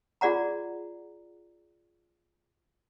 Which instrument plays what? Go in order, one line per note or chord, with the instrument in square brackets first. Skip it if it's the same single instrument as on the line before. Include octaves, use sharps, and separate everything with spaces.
[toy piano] F4 G#4 D5 F#5 A#5